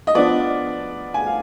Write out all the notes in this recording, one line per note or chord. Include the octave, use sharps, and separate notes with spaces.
D#5
F3 B3 D4 D5
G#5
F5